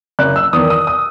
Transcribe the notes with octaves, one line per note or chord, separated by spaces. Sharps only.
F#1 F#6
E6
E2 D#3 D#6
D#6
D#6